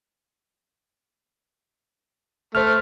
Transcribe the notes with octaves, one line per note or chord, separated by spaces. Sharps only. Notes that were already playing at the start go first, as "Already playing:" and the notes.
A3 C5 F6